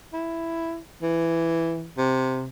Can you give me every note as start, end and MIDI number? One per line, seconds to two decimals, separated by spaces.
0.13 0.79 64
1.02 1.89 52
1.97 2.47 48